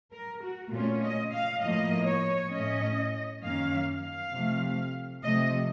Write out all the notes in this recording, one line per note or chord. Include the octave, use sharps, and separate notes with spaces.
A#4
F#4
A#2 A3 C#4 F4
D#5
F5
A2 F3 A#3 D#5
C#5
A2 A3 C#4 D#5
F#2 D#3 A#3 C#4 F5
F5
C3 F3 A3
C3 F3 A3 D#5